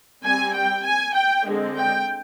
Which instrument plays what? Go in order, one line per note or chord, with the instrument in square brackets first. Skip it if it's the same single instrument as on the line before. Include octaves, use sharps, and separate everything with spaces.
[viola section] G3 C4 G#5
G5
G#5
G5
D3 G#3 C4
G5